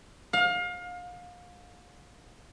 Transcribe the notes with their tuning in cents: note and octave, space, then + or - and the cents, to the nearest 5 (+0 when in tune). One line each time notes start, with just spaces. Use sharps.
F5 +30